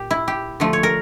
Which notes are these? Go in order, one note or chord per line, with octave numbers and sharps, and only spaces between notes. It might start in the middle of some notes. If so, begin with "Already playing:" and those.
Already playing: A#2 G4
E4
G4
D3 F3 A3
C#5
A#4